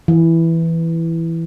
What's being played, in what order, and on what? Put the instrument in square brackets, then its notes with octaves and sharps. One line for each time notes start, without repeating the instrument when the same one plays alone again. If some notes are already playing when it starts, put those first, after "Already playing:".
[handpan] E3